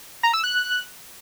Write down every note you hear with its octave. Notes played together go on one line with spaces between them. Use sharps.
A#5
E6
F#6